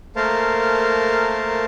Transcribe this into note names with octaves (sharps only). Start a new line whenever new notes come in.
A3 A#3 A#4 C5 F5 A5